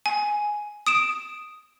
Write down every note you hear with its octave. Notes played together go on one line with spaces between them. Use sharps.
G#5
D#6 D7 E7